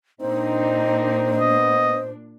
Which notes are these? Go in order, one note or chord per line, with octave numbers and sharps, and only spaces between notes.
A#2 A#3 C4 D4 D#4 C5
B3 D#5